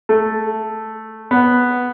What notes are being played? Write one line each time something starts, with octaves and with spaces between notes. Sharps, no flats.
A3
B3